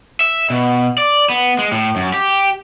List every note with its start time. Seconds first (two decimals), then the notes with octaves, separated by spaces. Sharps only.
0.21 E5
0.50 B2
0.98 D5
1.30 B3
1.59 G#3
1.72 A2
1.96 F#2
2.14 G4